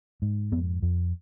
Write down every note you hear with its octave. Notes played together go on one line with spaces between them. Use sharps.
G#2
F2 B3
F2